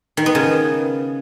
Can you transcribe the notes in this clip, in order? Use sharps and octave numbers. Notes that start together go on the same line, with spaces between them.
D#3
B3
C#3